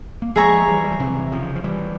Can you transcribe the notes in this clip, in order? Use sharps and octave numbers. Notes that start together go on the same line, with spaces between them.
A#3
F3 G#3 G#4 E5 A#5 C#6
E3 G3
G3
F3
C3 E3
C#3 F3
F3
E3 G3